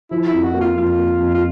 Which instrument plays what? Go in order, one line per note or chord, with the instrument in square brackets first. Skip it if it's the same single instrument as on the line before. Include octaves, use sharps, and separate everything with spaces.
[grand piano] F3 [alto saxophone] E4
[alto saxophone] E4
[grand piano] F2
[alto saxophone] F#4
[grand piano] A#3
[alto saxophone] F4
[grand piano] F2 [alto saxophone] F4
[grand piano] A#3
F2
[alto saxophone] F4